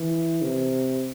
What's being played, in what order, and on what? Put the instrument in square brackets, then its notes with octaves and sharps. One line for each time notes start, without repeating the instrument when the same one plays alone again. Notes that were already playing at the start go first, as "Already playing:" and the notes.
Already playing: [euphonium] E3
C3